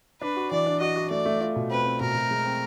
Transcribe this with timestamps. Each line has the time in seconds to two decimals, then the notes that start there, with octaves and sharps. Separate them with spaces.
0.21 D4 B4
0.36 F#4
0.51 E3 D5
0.66 D4
0.80 F#4 D#5
0.96 F#4
1.10 A3 D5
1.26 A3
1.41 F4
1.56 B2
1.70 C4 B4
1.85 C4
2.00 B2 A#4
2.15 B2
2.31 G#3
2.45 C4